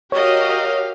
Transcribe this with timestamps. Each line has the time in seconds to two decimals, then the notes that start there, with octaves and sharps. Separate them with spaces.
0.12 F#4 G4 A#4 C#5 D#5 F5